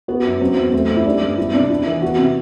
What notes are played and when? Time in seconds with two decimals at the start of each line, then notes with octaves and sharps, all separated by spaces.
0.08 B3 F#4
0.25 F#2
0.41 F#3 C4
0.57 E2
0.73 A3 C4
0.90 F#2
0.97 E4
1.06 G3 D4
1.22 G2
1.38 B3 E4
1.54 C3 D4
1.70 D4 E4
1.86 E3
2.02 B3 F#4
2.19 C3